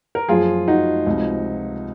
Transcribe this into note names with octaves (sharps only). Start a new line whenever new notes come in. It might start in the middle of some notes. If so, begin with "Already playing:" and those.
A#4
F#1 F#2 F3 F4 G#4
D#4 F#4
C#2 C3 F3